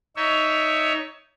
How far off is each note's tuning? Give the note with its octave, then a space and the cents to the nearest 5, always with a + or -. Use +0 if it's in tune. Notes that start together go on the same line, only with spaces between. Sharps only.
D#4 +0 C#5 +20 E5 +0